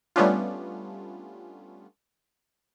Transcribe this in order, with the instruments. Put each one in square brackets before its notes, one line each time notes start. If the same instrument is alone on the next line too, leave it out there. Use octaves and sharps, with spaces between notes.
[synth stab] G3 A3 B3 C#4 D4 F4